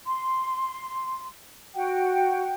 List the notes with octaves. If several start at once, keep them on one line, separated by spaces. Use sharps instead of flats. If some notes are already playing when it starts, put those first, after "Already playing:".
C6
F#4 F#5 G5